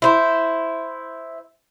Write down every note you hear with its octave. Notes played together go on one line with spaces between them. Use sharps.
E4 C5